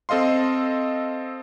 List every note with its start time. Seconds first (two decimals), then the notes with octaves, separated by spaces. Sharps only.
0.09 C4 A4 D#5 F5 C6